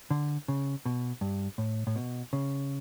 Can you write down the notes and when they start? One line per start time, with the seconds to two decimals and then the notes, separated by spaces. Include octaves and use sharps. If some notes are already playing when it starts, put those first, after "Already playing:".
0.11 D3
0.48 C#3
0.86 B2
1.21 G2
1.58 A2
1.87 A2
1.96 B2
2.33 C#3